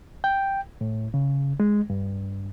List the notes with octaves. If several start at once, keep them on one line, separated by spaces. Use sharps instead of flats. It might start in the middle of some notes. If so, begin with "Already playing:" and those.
G5
A2
C#3
G#3
G2